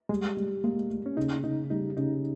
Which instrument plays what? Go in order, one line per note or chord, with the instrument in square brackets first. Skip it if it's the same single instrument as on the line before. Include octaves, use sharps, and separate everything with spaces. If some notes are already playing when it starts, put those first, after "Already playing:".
[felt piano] G3 [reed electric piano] G#3
[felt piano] G3
[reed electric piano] G#3 [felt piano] A#3
[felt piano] A#3
[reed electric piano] C#4
[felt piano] C#3 [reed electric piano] D#4
[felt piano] C#3 [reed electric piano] D#4
[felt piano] G3 [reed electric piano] D#4
[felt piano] C#3 [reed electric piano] D#4